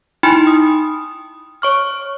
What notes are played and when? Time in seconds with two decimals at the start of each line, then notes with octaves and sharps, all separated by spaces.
0.23 D#4 E4 G5 G#5 B5 C6
0.47 D#6
1.62 C#5 C#6 F6